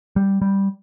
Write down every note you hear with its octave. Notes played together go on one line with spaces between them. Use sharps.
G3
G3